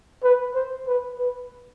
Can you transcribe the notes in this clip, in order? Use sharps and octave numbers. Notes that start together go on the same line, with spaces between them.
B4
C5
B4
B4